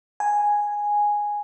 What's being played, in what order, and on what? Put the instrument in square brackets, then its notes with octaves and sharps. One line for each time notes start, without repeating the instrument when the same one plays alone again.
[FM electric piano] G#5